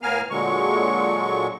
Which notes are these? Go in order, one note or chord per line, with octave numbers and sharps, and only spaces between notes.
A2 B3 A#4 F5 G#5 F6
A#2 D3 F#3 G#3 C#6